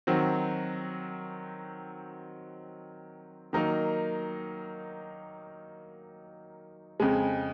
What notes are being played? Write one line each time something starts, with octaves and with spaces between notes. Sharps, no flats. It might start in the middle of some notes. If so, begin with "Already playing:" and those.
D#3 F#3 C4 F#4
D#3 F#3 A#3 D#4 A#4
F2 C#3 G#3